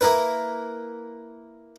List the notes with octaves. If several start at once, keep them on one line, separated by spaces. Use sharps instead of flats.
A#3 E4 A#4 B4